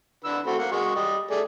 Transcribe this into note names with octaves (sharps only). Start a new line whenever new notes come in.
D3 B4 E6
A3 C4 F#4
A#3 F#5
G#3 F#4 C#6
G3 D#5
A3 G#4 D5